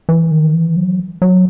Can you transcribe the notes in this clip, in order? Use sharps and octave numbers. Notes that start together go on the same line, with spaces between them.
E3
D#3
E3
F#3
F#3